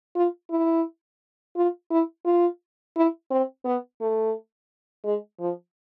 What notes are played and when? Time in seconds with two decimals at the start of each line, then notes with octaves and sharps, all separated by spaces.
0.15 F4
0.50 E4
1.56 F4
1.90 E4
2.25 F4
2.96 E4
3.31 C4
3.65 B3
4.01 A3
5.04 G#3
5.39 F3